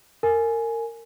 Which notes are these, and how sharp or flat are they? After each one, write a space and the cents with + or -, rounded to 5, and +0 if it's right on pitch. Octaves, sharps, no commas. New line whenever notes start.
A#4 -25 G#5 +10